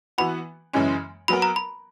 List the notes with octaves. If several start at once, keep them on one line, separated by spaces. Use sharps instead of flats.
E3 B3 F#4 B5
F#2 C#3 E3 G#3 C#4
F#3 B3 F#4 A#4 B5
A#5
B5